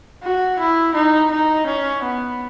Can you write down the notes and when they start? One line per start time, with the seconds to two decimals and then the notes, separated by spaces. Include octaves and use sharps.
0.23 F#4
0.59 E4
0.95 D#4
1.31 D#4
1.67 C#4
2.03 B3